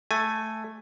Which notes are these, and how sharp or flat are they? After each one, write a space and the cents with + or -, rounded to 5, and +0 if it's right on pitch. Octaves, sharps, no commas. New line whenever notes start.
A3 +0 G#5 +0